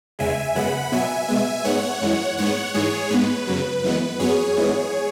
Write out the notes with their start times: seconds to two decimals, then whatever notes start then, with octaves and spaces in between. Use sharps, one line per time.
0.19 E2 C#3 G#3 E5 G#5
0.55 F#2 C#3 G#3 B3 F#5 B5
0.92 B2 F#3 B3 E5 G#5
1.28 B2 G#3 B3
1.64 G#2 G#3 B3 C#5 F#5
2.01 F#2 E3 G#3
2.37 G#2 G#3 B3 C#5 F#5
2.74 G#2 E3 G#3 G#4 C#5
3.11 G#2 G#3 B3 B4
3.47 F#2 C#3 F#3
3.84 F#2 E3 G#3 B3
4.19 F#2 F#3 B3 G#4 C#5
4.57 G#2 E3 G#3 B3